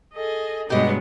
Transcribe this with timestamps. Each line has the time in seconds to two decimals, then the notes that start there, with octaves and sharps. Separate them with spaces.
0.14 G#4 A4 D#5
0.70 G2 B2 F#3 G#3 B3 G4 D#5